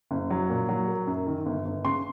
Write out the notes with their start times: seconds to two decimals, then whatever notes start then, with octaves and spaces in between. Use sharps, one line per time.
0.11 F#1
0.30 F#3
0.50 A#2
0.69 F#3
0.88 A#3
1.07 F#2
1.27 D#3
1.46 G1
1.65 G1
1.84 C#3 C6